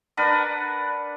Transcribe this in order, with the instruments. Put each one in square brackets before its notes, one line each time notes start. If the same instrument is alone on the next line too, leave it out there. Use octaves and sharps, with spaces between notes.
[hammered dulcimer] D4 A#4 B4 F#5